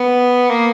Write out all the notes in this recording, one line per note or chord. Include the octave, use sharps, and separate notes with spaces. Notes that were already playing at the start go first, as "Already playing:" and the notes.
Already playing: B3
A#3